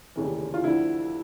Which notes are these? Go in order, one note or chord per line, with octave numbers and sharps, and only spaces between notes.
F1 D#2 C#3 E3
F4
D2 D3 F3 E4